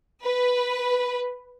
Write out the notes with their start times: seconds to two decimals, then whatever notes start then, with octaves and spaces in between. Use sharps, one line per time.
0.24 B4